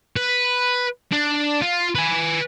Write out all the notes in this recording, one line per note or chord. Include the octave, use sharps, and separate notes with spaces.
B4
D4
F4
B4 G#5